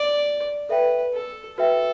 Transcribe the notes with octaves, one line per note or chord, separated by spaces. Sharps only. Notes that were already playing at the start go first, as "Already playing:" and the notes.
Already playing: D5
A4 B4 E5 G5
A4
F#4 A4 B4 E5 G5